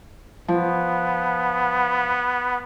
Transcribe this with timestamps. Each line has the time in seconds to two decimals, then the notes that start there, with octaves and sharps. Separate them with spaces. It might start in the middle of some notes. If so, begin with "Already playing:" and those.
0.48 F3 B3